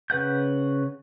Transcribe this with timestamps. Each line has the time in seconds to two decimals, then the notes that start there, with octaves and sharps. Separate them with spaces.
0.10 C#3 B4 F#5 G6